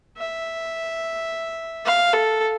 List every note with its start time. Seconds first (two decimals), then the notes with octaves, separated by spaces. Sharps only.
0.18 E5
1.86 F5
2.13 A4